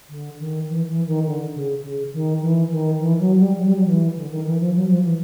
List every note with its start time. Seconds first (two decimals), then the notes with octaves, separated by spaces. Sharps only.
0.09 D3
0.39 D#3
0.68 E3
0.87 E3
1.06 D#3
1.25 D3
1.54 C#3
1.83 C#3
2.13 D#3
2.41 E3
2.70 D#3
3.00 E3
3.19 F#3
3.39 G3
3.58 F#3
3.67 G3
3.76 F#3
3.86 E3
4.16 D3
4.30 D#3
4.46 E3
4.60 F3
4.74 F#3
4.88 F3
5.03 E3